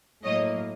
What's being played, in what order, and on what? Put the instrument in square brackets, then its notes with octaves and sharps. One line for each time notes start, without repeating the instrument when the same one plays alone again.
[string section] A2 F#3 A#3 C#5 D#5